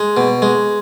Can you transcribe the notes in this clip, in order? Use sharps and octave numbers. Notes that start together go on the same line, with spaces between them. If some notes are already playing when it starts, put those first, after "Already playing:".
Already playing: G#3
B2
G#3